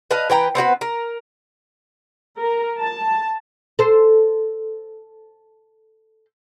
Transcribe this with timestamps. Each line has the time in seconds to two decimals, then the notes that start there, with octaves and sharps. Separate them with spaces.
0.11 B4 D#5 F5 A5
0.30 E3 B4 G5 A#5
0.55 B3 C4 F#4 B4
0.81 A#4
2.39 A#4
2.80 A5
3.79 A4 C5